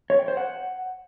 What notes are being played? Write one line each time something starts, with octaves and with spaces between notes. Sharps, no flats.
C#5
G5
C5
F#5